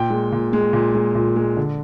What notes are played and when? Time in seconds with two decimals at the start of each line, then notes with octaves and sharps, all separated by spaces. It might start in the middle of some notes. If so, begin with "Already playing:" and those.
Already playing: A#2 G5
0.10 G#3
0.32 A#2
0.53 G#3
0.73 A#2
0.95 G#3
1.15 A#2
1.36 G#3
1.57 D3